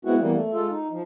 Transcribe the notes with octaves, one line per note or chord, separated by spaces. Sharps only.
G#3 B3 C4 E4 F#4
E3 G3 A#3 B3
A3
G#3 F4 A4
D#4
F3